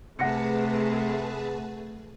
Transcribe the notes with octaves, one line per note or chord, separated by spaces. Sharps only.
C3 A3 G#4 B4 F#5 A5 A#6 C#7